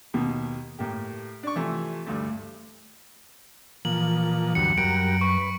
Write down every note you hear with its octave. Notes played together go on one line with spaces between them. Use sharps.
D#2 B2 D#3
A2 A#3 G4
D4 C#6
C3 E3 F3 A3
D2 G2 A3
A#2 E3 F3 F#7
D2 G2 F#3 C#7
F#2 G3 F#4 A#4 A#5 D7
B4 C#6